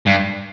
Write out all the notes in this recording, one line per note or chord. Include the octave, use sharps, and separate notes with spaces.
G2